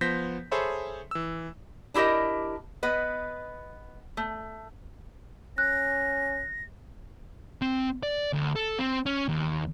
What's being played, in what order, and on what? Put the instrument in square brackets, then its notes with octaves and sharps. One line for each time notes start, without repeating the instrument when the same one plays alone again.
[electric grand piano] F3 B3 C5 G6 A#6 B6
G#4 A4 C5 C#5 E5 B5
E3 E6
[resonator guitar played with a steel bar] D4 E4 G4 A#4 D#5
B3 B4 D#5
A3
[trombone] C#4 [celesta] F#6 [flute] A#6
[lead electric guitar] C4
D5
D2
A4
C4
C#4
D#2